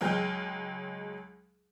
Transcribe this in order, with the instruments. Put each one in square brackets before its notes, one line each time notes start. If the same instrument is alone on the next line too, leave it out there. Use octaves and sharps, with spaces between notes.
[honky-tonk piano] C#2 F#3 G#3 G5 F6 G6